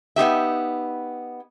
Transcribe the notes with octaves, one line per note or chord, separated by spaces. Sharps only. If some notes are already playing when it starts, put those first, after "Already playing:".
B3 D#4 G4 E5